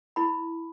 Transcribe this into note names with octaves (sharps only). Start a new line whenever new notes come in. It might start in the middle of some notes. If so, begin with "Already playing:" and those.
E4 B5